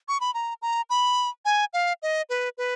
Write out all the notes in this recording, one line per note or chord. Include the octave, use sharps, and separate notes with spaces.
C#6
B5
A#5
A#5
B5
G#5
F5
D#5
B4
B4